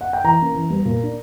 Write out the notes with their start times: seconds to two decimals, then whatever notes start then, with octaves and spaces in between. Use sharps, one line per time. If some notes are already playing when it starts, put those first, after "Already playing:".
0.01 F#5
0.13 G5
0.24 E3 A#5
0.40 A#3 C#4
0.55 E3
0.70 G3 B3
0.85 A#2
1.01 A#3 D4